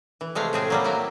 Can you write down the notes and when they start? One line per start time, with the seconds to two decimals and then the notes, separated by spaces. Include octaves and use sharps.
0.21 E3
0.35 C3 G#3 A3 F5
0.53 A2 C4 G#4
0.70 F#3 G3 A#3
0.84 F#3 A#3 E4